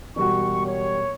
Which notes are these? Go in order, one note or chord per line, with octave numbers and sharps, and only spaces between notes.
E1 G3 F#4 C#6
C#5